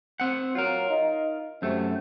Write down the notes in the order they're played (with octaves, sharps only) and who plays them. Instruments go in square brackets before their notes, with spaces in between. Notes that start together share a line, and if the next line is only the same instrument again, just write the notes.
[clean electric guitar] C4 F#5
[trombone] F#3 [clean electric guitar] F4 A#4
[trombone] D#4
[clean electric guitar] F#2 A3 [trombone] C3